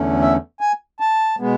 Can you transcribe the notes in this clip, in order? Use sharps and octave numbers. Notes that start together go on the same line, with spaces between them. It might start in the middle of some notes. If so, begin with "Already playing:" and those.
Already playing: E2 D3 A3 C#4
E5
G#5
A5
B2 G#3 B3